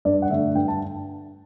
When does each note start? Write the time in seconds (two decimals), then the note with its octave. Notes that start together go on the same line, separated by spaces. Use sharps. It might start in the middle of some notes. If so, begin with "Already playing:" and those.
0.05 G2 D5
0.22 F#5
0.30 D3 A3 E5
0.55 G2 G5
0.68 A5